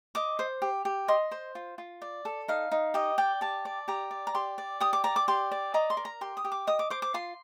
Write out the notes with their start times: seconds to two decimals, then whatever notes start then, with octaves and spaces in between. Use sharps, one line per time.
0.15 D#5 D6
0.39 C5
0.62 G4
0.85 G4
1.08 D#5 C6
1.31 C5
1.55 F4
1.78 F4
2.02 D5
2.25 A4
2.48 D#4 F5
2.72 D#4
2.94 G4 D#5
3.18 D5 G5
3.41 G4 A5
3.65 D5
3.88 G4 A#5
4.11 D5
4.27 A#5
4.34 G4 C6
4.58 D5
4.80 G4 D#6
4.93 D6
5.04 D5 A#5
5.16 D6
5.28 G4 C6
5.51 D5
5.74 D#5 A#5
5.90 C6
5.97 A#4
6.05 A#5
6.21 G4 C6
6.37 D#6
6.44 G4
6.52 D6
6.67 D#5 D#6
6.79 D6
6.90 C5 D6
7.02 D6
7.14 F4 C6